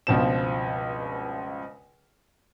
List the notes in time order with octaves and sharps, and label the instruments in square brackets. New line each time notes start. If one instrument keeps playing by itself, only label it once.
[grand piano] C#2 G2 B2 F3 C4 E7